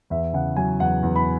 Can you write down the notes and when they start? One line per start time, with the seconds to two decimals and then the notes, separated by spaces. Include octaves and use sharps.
0.10 E2 E5
0.33 C#3 F#5
0.56 F#3 G#5
0.80 E2 F#5
1.03 E2
1.16 B5